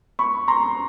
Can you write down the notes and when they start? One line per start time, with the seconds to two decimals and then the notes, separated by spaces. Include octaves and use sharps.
0.19 B5 C#6
0.48 A#5 C6